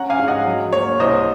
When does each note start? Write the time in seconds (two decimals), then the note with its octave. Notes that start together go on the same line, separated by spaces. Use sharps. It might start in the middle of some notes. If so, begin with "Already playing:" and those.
Already playing: C#4 F#5 A#5
0.10 F5 G#5
0.19 G#2
0.28 D#5 F#5
0.46 F#3
0.73 A#3 C#5
0.99 C2 C5 D#5